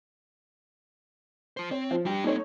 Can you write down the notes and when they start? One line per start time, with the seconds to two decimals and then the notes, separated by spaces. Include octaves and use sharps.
1.57 F4 C5
1.71 C4 C#5
1.91 F3
2.06 G3 D4 G4 G5
2.24 A#3 C4 D#4 A4 C#5